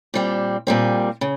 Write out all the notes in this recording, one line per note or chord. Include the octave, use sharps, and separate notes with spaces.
A#2 G3 C4
A#2 G3 C4
C#3